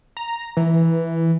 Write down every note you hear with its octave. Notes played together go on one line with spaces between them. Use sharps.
A#5
E3